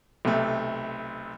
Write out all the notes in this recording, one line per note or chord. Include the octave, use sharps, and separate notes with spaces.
B1 C3 A3